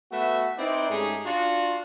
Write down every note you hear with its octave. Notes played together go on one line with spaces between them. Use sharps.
A3 B3 F#4 B4 E5
C4 D#4 E4 B4 C5 D5
G#2 A3 C#4 D#4 G4 G#4
D4 F4 F#4